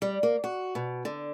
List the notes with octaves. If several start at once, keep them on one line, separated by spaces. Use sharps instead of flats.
G3
A#3
F#4
B2
D3